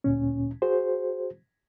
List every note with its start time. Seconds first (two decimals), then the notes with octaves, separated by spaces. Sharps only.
0.04 D2 A#2 C#4
0.62 F#4 G#4 C5